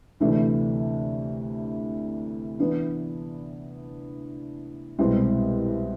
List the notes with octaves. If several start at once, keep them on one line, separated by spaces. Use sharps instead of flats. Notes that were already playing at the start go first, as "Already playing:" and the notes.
D2 C3 E3 A3 D4
E3 B3 D4
C2 B2 G#3 C4 E4